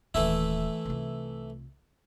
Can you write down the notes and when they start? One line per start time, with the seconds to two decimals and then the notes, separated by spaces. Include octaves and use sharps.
0.14 D#1 D#3 E3 A3 E4
0.85 C2 F4